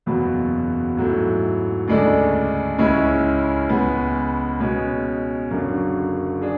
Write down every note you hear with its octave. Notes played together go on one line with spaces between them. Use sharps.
F#1 E2 B2 F#3 B3
G#2 F#3 A3 E4
D2 C#3 G#3 D4 A4
C#2 C#3 G#3 C#4 E4
C#2 C#3 G#3 B3
B2 G#3 C#4
F#1 F#2 D3 F#3
D4 G#4